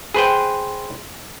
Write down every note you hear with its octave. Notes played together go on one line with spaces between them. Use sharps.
G#4 B4 C5 G5